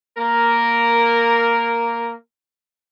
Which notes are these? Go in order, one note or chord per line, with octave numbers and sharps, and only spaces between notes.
A#3 A#4